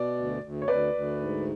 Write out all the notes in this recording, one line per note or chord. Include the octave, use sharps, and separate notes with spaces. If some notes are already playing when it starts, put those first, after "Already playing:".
Already playing: B2 D5
D2
D2
C#5
D2 B4 D5
D2
G#2